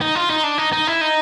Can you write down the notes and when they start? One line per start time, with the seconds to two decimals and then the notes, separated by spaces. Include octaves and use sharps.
0.01 D#4
0.15 F4
0.30 D#4
0.44 D4
0.58 D#4
0.73 D#4
0.87 E4
1.01 D#4